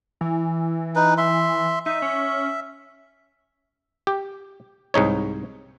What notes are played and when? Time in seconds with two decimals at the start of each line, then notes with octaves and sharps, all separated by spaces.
0.21 E3
0.96 D#4 B4
1.18 E5 C6
1.86 D#4 E5
2.02 C#4
4.07 G4
4.94 C2 G#2 D#4 C#5